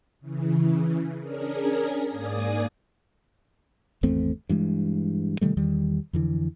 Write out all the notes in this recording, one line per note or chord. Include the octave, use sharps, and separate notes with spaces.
C#3 E3
C#4 D4 G#4 A#4
G#2 A#3 D5 G#5 D#6
G#1 E2 A3 C4
G2 E3 G#3
C3 D#3 G3 A3
E2 D#3 G3
F2 D3 E3